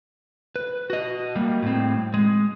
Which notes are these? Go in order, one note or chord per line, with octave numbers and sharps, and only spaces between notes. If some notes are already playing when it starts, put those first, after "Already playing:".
B4
F#4 D#5
G3 A#3
A2 C4
G#3